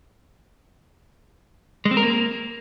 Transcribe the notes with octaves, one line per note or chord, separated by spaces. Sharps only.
G#3
C4
A#4
A#3